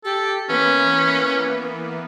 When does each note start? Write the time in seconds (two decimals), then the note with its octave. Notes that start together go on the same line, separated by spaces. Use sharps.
0.04 G4 A4
0.49 E3 A#3 B3 C#4 B4